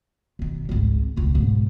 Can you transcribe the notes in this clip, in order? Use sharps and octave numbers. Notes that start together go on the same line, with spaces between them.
B1 D#3
G#1 C#2
E1 C#2
B1 G#2